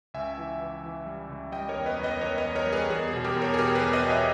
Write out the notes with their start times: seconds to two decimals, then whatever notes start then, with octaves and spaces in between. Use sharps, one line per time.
0.14 C#2 E5 G#5
0.38 E3
0.60 E3
0.83 E3
1.06 G3
1.29 C#2
1.52 G3 D#5 G5
1.69 A#4 C#5
1.76 E2
1.86 B4 D#5
1.98 E2
2.03 B4 D#5
2.21 E2 A#4 C#5
2.38 B4 D#5
2.45 E2
2.55 A#4 C#5
2.66 G3
2.73 G#4 B4
2.90 E2 G#4
3.08 G#4
3.13 B2
3.24 G4 A#4
3.36 E2
3.42 A#4 C#5
3.54 G#4
3.59 B2 G4 A#4
3.75 G#4 B4
3.81 E2
3.93 B4 D#5
4.04 B2
4.10 C#5 E5